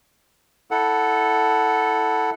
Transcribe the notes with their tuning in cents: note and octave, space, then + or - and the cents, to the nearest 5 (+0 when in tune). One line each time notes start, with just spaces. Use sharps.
E4 -15 A4 +0 F#5 +0